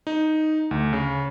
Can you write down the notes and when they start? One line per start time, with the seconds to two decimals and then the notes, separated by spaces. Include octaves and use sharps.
0.07 D#4
0.71 D2
0.93 C#3